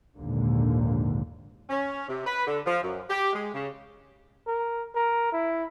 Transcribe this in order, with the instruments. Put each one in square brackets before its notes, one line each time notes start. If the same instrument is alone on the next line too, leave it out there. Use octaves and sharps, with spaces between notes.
[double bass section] A#1 D#2 G#2 D3 A#3
[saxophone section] C#4
C3
B4
D3
F3
F#2
G4
G#3
C#3
[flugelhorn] A#4
A#4
E4